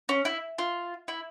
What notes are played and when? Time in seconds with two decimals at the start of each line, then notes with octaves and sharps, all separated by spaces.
0.09 C#4
0.25 E4
0.58 F4
1.08 E4